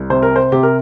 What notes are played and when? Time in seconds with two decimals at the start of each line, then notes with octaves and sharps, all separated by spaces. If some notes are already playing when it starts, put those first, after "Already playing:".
Already playing: C2
0.10 C3 C5
0.23 A#4
0.36 C5
0.52 C3 G4
0.63 A#4